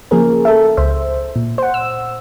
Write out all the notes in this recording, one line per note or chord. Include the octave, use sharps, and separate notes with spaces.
C#3 F3 A#3 G#4 A#4
A4 E5
C#2 C5 E5
A#2
C5 F#5
E6